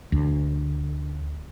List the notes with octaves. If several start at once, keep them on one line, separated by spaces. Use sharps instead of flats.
D2